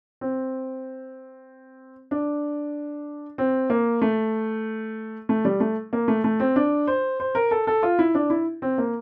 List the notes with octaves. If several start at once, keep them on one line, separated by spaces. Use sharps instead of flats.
C4
D4
C4
A#3
A3
A3
G3
A3
A#3
A3
A3
C4
D4
C5
C5
A#4
A4
A4
F4
E4
D4
E4
C4
A#3